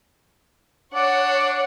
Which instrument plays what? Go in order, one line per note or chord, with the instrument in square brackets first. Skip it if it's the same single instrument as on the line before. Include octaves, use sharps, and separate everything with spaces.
[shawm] D4 [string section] C#5 F#5